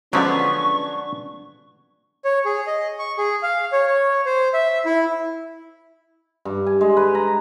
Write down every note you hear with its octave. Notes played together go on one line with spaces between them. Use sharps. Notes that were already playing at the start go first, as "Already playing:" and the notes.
D3 F3 F#3 G#3 B3 C#4 D4 C#6
C#5
G#4
D#5
C#6
G#4
F5
C#5
C#5
C5
E5
E4
G2
G#5
G#3
B4
A#5